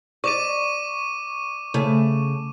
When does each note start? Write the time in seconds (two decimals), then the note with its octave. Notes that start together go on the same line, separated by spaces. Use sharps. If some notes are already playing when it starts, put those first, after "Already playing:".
0.24 D5 C#6 D6 D#7
1.74 C#3 A3